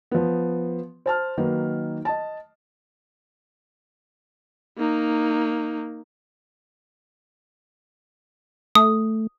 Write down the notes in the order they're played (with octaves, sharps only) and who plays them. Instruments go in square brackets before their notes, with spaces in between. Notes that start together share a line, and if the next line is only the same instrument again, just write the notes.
[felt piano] F3 B3
C5 A5 F6
D#3 F#3 A#3 D#4 B4
D#5 A5
[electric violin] A#3 D#4
[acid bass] A3 [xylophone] D#6